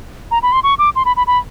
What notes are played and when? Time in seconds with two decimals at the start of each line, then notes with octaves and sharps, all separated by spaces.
0.31 A#5
0.43 B5
0.52 C6
0.63 C#6
0.79 D6
0.96 C6
1.05 B5
1.16 B5
1.27 B5